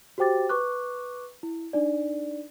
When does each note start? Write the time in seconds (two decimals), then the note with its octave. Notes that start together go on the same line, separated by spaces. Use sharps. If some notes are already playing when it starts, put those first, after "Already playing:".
0.18 F#4 G4 C5 G5 D6 A6
0.49 B4 C#6 D6 F#6
1.43 E4
1.73 D4 D#4 D5